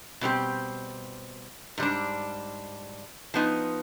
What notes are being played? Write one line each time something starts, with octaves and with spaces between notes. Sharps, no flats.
B2 G3 C4 G4
G#2 G3 D4
F3 B3 D#4